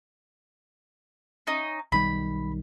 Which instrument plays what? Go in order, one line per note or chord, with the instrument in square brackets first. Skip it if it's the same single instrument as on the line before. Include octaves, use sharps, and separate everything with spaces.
[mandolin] C#4 D#4
[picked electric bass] B1 D#3 G3 [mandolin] B5